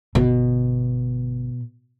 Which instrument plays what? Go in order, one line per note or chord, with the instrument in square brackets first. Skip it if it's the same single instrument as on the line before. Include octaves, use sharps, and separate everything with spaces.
[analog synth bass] G1 [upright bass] B2